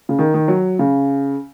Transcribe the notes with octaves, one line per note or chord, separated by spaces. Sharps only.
C#3
D#3
D#3
F#3
C#3